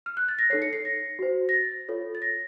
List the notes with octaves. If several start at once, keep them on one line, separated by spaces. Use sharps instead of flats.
F6
F#6
A6
A#6
D#4 A4 C#5 C7
C#7
C7
A#6
F#4 C5
A#6
A6
F4 A4 C#5
A6
A#6